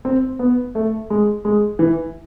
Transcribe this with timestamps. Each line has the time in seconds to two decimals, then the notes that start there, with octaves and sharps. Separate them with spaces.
0.05 C4
0.39 B3
0.75 A3
1.10 G#3
1.45 G#3
1.79 E3